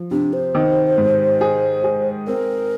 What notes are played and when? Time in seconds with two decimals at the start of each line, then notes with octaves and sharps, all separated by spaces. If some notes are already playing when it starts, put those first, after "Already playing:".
Already playing: F3
0.11 C3 D4
0.33 C5
0.55 D#3
0.98 G#2
1.41 G#4
1.84 G#4
2.27 C4 A#4